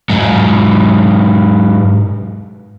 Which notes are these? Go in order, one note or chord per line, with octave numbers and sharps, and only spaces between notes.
G#2 F#3